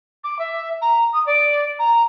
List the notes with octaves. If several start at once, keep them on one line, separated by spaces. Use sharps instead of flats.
D6
E5
A#5
D#6
D5
A#5